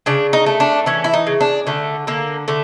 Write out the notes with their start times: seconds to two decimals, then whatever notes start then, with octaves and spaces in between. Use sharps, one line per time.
0.06 C#3 D4
0.33 D#4
0.46 A3
0.60 D4
0.86 E3 C#4
1.04 E4
1.14 D#4
1.27 C#3
1.41 D4
1.67 D3 A3
2.07 D3 A#3
2.48 D3 A3